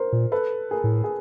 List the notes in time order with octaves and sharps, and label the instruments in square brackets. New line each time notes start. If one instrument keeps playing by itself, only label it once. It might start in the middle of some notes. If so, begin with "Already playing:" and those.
Already playing: [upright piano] A#4 C5
[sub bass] A#2
[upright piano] A4 B4
G#4 A#4
[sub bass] A2
[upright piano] G#4